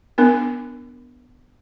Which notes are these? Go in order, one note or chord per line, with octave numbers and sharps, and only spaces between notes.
B3 D4 A#4